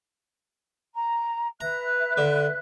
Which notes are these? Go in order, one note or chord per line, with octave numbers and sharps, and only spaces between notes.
A#5
B4 E5 A#5 F#6
D3